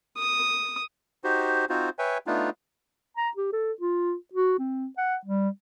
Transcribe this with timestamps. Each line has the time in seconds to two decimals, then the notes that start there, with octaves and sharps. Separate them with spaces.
0.18 D#6
1.24 D#4 F#4 G4 C5
1.69 C4 D#4 F4 F#4 C5
1.99 B4 C#5 E5 G5 G#5
2.27 A3 B3 D4 D#4 F4
3.17 A#5
3.37 G4
3.53 A4
3.81 F4
4.33 F#4
4.59 C4
4.98 F#5
5.25 G3